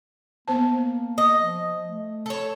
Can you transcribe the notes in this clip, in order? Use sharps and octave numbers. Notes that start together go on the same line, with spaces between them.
A#3 B3 C5 A5
D#5
F3
A3
A4 C#5